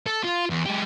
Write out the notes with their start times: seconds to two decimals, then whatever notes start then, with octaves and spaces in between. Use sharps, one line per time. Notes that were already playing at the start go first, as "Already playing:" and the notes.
0.06 A4
0.24 F4
0.50 E2
0.66 G#3 G4